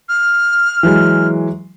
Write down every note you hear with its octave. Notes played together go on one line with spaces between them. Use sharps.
F6
E3 F#3 G#3